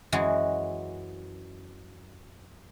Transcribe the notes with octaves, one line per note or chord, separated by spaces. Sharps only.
F#2 E3 G#3 F#4 G#4